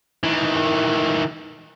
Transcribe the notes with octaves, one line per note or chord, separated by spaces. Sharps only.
D#3 E3